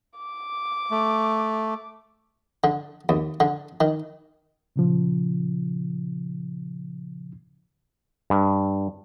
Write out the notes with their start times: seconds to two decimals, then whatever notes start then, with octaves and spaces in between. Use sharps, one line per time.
0.17 D6
0.91 A3
2.64 D3
3.09 D#2
3.40 D3
3.81 D#3
4.76 A#2 C#3 F3
8.30 G2